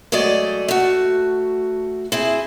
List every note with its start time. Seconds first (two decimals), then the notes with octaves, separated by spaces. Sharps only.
0.12 F#3 G#3 A3 D5 D#5
0.68 A3 F#4
2.12 C4 E4 G#4